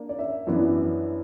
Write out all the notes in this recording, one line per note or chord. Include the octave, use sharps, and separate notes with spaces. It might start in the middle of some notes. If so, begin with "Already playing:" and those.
Already playing: A#3 D4
D5
E5
F#2 E3 B3 D4